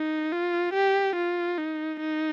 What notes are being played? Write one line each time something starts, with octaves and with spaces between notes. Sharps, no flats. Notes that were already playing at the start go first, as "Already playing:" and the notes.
Already playing: D#4
F4
G4
F4
D#4
D#4